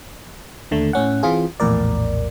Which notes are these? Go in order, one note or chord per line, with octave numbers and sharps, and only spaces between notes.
D#2 D3 A3
A2 C#4 F#5
E3 C4 F4 G#4
A#1 E2 A2 A#4 D5